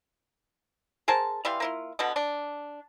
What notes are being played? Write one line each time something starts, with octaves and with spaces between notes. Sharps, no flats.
G#4 A#4 C5 A5
E3 G3 F5 C6
A#3 E4 F4
B2 D3 B3
D4